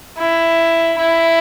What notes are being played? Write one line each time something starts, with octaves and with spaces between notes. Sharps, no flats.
E4
E4